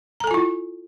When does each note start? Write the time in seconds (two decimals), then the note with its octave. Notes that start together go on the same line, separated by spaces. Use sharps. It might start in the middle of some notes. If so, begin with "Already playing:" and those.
0.20 A#5
0.24 A4
0.27 G#5
0.31 F4
0.34 E4